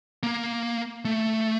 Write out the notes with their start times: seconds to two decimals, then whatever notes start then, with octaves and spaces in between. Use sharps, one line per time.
0.23 A#3
1.05 A3